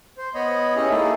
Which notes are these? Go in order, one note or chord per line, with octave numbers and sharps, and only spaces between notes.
C5
B3 C#5 D#5 B5
C#4 E4 G4 G#4 D#5 B5
A3 A#3 D#4 E4 G#4 A4